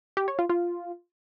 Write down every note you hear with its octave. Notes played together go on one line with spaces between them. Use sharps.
G4
C#5
F4
F4